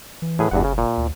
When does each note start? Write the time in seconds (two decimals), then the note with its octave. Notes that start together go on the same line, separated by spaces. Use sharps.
0.22 E3
0.39 A2 G#4 B4
0.51 F#1 E2 G2 F#5
0.64 C#3
0.78 A#2
0.98 D2